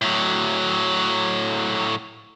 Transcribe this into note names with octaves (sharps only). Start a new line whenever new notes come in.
A2 F#3